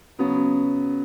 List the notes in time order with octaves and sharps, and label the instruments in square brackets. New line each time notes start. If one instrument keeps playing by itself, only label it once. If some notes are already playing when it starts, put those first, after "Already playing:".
[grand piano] C#3 F#3 B3